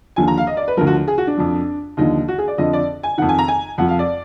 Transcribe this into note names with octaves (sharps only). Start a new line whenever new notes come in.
D#2 D3 F3 G#5
A#5
F5
D#5
D5
B4
D2 D3 F3 A#4
F#4
G#4
F#4
D4
F2 F3
D#2 D3 F3 D#4
F#4
G#4
D5
F2 D3 F3 D#5
D5
G#5
F2 D#3 F#5
G#5
A#5
G#5
F2 F3 F#5
F5
D5